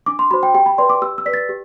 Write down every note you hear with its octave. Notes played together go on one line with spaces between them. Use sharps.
D4 D6
C6
F#4 C5 B5
G5
G4 G5
B5
B4 D5 C6
D6
G4 E6
E6
B4 D5 B6
A6
G4